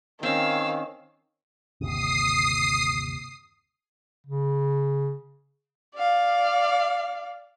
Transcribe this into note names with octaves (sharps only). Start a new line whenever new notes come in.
D#3 C4 C#4 F5 E6
G1 D#2 C3 D#6 C7
C#3
D5 F5